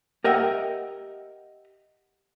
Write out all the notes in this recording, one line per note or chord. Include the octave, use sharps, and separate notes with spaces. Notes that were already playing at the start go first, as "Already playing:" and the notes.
G4 A#4 D#5 E5 F#5 G5